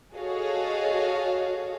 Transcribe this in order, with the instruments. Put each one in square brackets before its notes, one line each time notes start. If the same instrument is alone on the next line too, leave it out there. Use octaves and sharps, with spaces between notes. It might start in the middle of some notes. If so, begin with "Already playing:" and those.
[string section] F#4 G#4 A4 C#5 D#5 F5